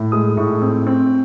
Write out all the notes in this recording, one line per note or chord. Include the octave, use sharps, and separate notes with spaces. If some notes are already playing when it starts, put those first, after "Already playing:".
Already playing: A2
G#3 D#6
A2 C#6
C4
C4